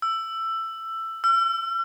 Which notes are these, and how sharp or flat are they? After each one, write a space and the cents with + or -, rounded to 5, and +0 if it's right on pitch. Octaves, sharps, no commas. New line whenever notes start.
E6 +15
E6 +45